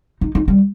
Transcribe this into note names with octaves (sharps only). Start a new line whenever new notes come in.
D#4
D#4
G3